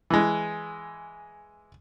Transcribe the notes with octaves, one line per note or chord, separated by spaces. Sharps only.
E3 G#3